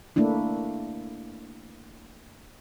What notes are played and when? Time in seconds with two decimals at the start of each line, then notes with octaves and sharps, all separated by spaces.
0.16 A3 A#3 D4 E4